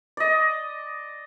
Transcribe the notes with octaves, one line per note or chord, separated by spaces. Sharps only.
D5 D#5